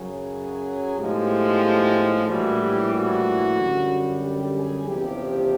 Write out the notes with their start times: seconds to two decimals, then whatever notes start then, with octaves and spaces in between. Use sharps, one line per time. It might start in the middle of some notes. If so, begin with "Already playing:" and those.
Already playing: F#2 C#3 F#3 G#4
0.96 B1 A2 F3 G#3 G4
2.26 A#1 A2 E3 G3 F#4
2.59 G4
2.92 F#4
3.57 F#2 D3 G3
4.22 G4
4.55 G#4
4.87 F#1 E2 C3 F3 G4